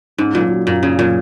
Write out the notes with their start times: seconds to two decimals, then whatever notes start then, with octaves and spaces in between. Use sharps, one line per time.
0.18 G#2 C#4
0.35 A#2 F#3
0.50 F#4
0.66 F#2 A#2
0.83 C#3 C#4
0.98 A#2 F#3